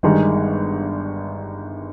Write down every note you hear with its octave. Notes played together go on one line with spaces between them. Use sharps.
G1 G2 D#3 G#3